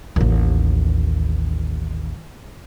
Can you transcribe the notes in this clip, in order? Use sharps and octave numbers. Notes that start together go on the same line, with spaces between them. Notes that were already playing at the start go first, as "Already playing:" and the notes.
A1 D#2